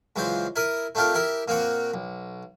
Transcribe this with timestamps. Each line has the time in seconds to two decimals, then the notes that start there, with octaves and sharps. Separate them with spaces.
0.16 C#2 E3 F#3 F4 C5
0.56 E4 A#4 D#6
0.95 A3 C4 D4 F4 G4 A#4
1.14 E4 G4 A#4 E5
1.48 A#2 A#3 C4 F#4 F#5
1.94 B1